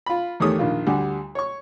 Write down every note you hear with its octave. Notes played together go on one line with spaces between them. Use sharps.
F4 B5
E2 D#3 A3 G4 C#5 D#6
A#1 D#3 F4
D2 G3 G4 F#5 G#5
C#5 C#6